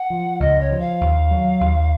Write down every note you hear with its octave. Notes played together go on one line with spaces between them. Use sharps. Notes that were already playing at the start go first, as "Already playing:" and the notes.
Already playing: F#5
F3
C#2 D#5
C#5
F3
F5
D#2
F#3
D#2